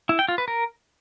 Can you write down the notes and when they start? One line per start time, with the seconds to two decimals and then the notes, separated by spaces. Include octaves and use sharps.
0.09 E4
0.19 G5
0.28 F4
0.38 B4
0.48 A#4